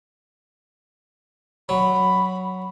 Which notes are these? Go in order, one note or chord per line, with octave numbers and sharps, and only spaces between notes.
F#3 B5